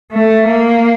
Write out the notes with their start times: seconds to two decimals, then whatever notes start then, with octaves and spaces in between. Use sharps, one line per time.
0.13 A3
0.46 A#3